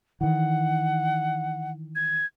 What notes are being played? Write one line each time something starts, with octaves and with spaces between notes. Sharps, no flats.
D#3 E3 F#5
G#6